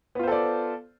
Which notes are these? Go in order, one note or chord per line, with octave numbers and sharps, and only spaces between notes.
B3 F4 A4 C5 D5